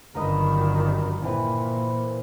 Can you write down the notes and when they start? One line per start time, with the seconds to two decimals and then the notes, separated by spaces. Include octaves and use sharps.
0.15 G1 F#2 D#3 A#4 B4 D#5
1.22 A#2 E3 C4 B4